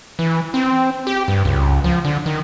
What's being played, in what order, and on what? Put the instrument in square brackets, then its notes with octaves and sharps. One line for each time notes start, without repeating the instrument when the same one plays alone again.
[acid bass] E3
C4
G4
G2
C#2
F3
D3
D#3